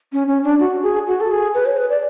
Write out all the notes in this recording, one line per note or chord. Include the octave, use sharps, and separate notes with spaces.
C#4
C#4
D4
F#4
G#4
F#4
A4
G#4
B4
C#5
B4
D5